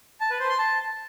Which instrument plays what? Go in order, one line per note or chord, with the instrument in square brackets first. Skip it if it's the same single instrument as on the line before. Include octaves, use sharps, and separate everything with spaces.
[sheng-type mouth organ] A5
B4
C5
C6
A5